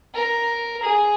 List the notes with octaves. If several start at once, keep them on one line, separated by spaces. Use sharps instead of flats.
A#4
G#4